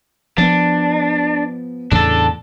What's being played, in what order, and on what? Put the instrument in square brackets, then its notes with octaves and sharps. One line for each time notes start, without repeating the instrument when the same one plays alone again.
[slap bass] F3 B3 [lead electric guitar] D4
[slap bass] E2 A2 C#3 [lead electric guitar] D4 A4